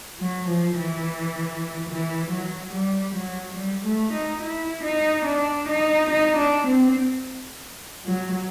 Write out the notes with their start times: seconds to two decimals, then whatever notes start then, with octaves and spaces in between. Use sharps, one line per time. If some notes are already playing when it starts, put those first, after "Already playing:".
0.20 F#3
0.47 F3
0.77 E3
1.89 E3
2.30 F#3
2.73 G3
3.15 F#3
3.57 G3
3.85 A3
4.14 D#4
4.41 E4
4.84 D#4
5.26 D4
5.68 D#4
6.10 D#4
6.38 D4
6.66 C4
8.07 F#3